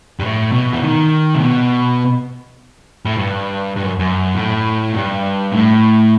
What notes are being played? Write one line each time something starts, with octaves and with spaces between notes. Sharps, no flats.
G2
A2
B2
E3
D#3
C3
B2
A2
G2
G2
F#2
F#2
A2
G2
A2